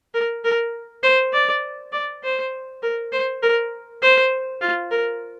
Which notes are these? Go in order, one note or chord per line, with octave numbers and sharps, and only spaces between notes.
A#4
A#4
C5
D5
D5
C5
A#4
C5
A#4
C5
F4
A#4